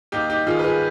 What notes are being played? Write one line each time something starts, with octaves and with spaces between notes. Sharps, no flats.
D#2 D#4 G4
D#4 G4
D#3 F4 G#4
B4
F4 G#4